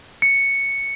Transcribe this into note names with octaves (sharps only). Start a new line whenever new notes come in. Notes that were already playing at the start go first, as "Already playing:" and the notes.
C#7